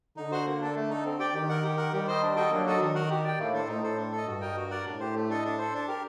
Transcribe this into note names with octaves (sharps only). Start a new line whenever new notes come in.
D3 D#4
F#4 C5 F#5
A#3
D4 A4
A3
D#4 A4
C4
G4 D5 G5
D#3 G4
A#4 F#5
G4
A#4 F#5
D#3 G3 G4
C5 D#5
D4
F#4 A4 D#5 G5
D3 F#3 A#3
D#4 F#4 A4 D#5
D#3 D4
F#4 A#4 F#5
G4
D5 G5
A2 A#3
D4 A4 C5
A2 D#4
A4 C5
D4
A4
D#5
G2 F#4
A#4 D#5 G5
F#4
A#4 D5 F#5
A2 D4
G4 C5
A3
D4 A4 D#5
D4
A4 C5
D4
G4 A#4